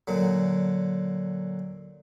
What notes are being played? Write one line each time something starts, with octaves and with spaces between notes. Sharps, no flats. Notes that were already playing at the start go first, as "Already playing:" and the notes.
A#2 D3 F#3